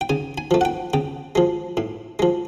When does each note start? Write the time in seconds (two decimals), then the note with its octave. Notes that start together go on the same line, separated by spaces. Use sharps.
0.01 G5
0.09 C#3 G#5
0.38 G#5
0.51 F3 A3
0.61 F#5
0.65 G5
0.94 C#3 G5
1.35 F3 G#3
1.77 A2
2.19 F3 G#3